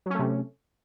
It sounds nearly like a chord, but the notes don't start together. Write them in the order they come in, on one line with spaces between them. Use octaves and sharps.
F#3 C#4 A3 C3